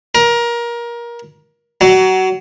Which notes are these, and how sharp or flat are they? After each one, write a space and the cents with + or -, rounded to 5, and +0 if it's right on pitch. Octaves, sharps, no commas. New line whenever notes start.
A#4 +25
F#3 +20